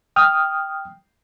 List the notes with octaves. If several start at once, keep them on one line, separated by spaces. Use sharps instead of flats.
G5 D#6 F6